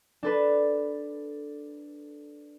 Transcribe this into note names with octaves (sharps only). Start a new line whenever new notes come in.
D4 A4 B4